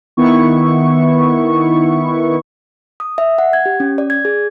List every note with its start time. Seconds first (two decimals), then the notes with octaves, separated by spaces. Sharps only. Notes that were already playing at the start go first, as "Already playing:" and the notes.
0.17 D#3 B3 E4 C#6
3.00 D#6
3.18 E5
3.38 F#5
3.53 G#6
3.66 G4
3.80 C#4
3.98 D5
4.10 G#6
4.25 G#4